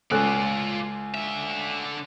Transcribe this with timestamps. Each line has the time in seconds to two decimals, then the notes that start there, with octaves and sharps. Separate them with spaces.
0.11 C#2 F4 A4 D5 F#6
1.15 D3 E5